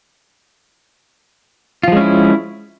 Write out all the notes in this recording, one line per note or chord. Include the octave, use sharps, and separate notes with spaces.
F3 G#3 C#4 E4 F4